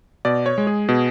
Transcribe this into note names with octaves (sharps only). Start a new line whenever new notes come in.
B2 D5
C#5
G#3
G#4
B2